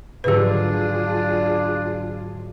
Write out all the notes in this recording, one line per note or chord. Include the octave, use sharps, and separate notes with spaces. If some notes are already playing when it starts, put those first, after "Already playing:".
G#2 D3 F#3 D4 F4 G4 G#4 B4